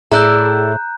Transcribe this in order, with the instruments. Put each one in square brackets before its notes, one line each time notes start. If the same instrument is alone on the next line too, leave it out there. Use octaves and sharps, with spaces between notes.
[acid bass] A2 [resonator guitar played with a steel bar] E4 A4 D5 [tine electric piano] G#4 [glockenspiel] A#5 F#6 G6